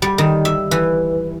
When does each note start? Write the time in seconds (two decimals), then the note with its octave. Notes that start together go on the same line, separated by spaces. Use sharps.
0.02 G3
0.18 D#3
0.45 E5
0.71 E3